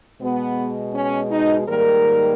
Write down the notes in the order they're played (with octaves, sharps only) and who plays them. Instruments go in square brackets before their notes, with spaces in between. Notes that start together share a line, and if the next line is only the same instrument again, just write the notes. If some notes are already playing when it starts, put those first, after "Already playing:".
[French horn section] B2 G#3 B3
C#4
D#4
G#2 D#3 G3 A#3 A#4